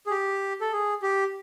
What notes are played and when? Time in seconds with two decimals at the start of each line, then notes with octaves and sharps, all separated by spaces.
0.07 G#4
0.11 G4
0.61 A4
0.72 G#4
1.03 G4